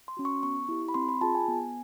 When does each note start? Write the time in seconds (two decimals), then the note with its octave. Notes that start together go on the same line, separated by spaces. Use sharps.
0.08 C6
0.17 C#4 F#4
0.25 C#6
0.43 B3 C#6
0.69 E4 G4
0.89 B5
0.94 C4 C6
1.09 B5
1.21 F4 G#4 A5
1.35 G#5
1.48 B3